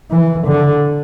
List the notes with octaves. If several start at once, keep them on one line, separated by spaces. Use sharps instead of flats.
E3
D3